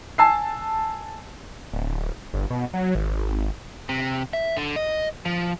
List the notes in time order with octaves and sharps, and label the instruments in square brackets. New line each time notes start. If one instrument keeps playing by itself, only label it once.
[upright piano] G#5 A5 E6 C7
[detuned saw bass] D1
G1
B2
F#3
G#1
G#1
[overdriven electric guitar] C3
E5
D3
D#5
F3